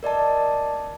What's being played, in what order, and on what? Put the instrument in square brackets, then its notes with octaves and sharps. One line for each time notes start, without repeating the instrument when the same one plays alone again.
[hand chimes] A#4 D5 D#5 A5